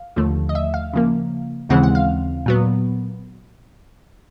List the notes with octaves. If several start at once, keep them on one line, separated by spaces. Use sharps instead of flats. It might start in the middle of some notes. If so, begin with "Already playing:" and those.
Already playing: F5
D#2 D3 F3 A3
D#5
E5
F5
C#3 F3 A#3
D#2 C#3 E3 G#3 C4 F#5
F#5
F5
A#2 F#3 B3